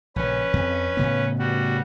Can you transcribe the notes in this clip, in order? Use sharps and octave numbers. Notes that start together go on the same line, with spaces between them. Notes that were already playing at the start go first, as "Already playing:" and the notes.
A#1 C#3 C#4 B4
F2 C4
A2 C#3 B3
G3 F#4